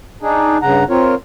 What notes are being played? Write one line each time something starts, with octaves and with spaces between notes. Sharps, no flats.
D4 D#4 G#4
G2 C#3 F#5 A#5
C4 F4 A#4 C#5